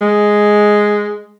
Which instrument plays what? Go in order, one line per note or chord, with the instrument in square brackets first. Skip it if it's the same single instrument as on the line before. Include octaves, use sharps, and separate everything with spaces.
[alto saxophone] G#3